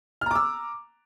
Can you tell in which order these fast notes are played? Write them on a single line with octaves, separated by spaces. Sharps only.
F6 A#5 D6 E6